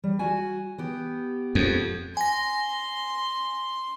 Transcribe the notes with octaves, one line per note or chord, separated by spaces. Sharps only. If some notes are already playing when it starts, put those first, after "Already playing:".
G3
F#4 G#5
B3 G4
F2
G#5 C6 A#6